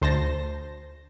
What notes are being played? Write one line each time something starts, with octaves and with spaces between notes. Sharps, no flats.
D2 C5 A5 A#6